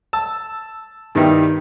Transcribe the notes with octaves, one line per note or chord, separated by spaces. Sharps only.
A5 E6
G2 D#3 G3 B3 D#4 E4